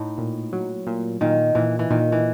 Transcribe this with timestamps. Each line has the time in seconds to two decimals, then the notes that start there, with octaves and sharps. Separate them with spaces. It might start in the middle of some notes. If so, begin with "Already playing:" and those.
Already playing: A2 D#4
0.18 A#2
0.53 F#3
0.87 A#2
1.21 A#2 D#3
1.55 A#2 E3
1.79 E3
1.90 A#2 D#3
2.12 E3